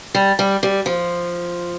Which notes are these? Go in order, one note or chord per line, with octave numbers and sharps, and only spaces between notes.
G3
G3
G3
F3